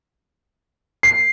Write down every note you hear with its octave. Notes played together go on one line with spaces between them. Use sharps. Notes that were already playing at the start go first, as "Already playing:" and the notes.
C7